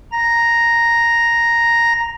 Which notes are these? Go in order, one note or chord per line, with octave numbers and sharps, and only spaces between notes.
A#5 A#6